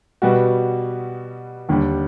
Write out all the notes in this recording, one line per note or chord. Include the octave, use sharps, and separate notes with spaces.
B2 G3 B3 F#4
D#2 D3 G3